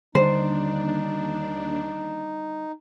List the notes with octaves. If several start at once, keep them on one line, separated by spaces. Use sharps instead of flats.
D#2 D3 G3 D4 D#4 C5